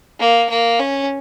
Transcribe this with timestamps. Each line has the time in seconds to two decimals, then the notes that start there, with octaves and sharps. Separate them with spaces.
0.20 A#3
0.50 A#3
0.80 C#4